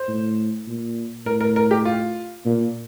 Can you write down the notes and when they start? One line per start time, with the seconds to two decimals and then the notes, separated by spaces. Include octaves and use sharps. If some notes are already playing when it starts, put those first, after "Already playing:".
Already playing: C5
0.08 A2
0.67 A#2
1.26 A2 A#4
1.41 A#4
1.56 A#4
1.71 G4
1.85 F4
2.45 A#2